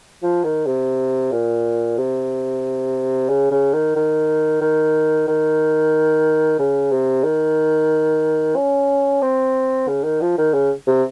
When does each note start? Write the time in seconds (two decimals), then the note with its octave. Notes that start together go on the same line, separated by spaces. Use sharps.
0.23 F3
0.44 D#3
0.67 C3
1.32 A#2
1.98 C3
3.29 C#3
3.51 C#3
3.74 D#3
3.96 D#3
4.61 D#3
5.28 D#3
6.59 C#3
6.92 C3
7.24 D#3
8.56 C#4
9.22 C4
9.88 C#3
10.04 D#3
10.21 F3
10.38 D#3
10.54 C#3
10.87 C3